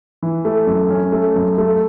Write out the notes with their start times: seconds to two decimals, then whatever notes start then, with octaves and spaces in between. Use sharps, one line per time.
0.23 E3
0.45 A3
0.67 F#2
0.90 C#4
1.12 A3
1.36 F#2
1.58 A3